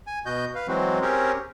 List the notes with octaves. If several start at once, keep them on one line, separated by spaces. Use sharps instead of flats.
G#5
B2 F#4 D#5 G6
B4 F5
E3 F#3 G#3 C4 F#4
C4 C#4 G4 G#4 A#4 C#5